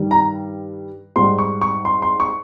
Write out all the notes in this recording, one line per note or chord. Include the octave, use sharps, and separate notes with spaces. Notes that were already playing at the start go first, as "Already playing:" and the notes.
Already playing: G2 D#3 G3
A#5
G#2 G3 C6
C#6
C#6
C6
C6
C#6